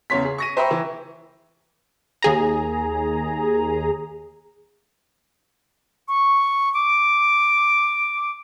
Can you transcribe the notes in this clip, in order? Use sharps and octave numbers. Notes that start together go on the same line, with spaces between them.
E2 C#3 C#5 C6 B6
G#4
C#6 A#6 D#7
C5 E5 G5 A#5 B5 C#6
E3
D#2 G#4 A#5
C#6
D6